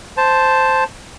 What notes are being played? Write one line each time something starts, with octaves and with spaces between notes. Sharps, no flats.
C5 A5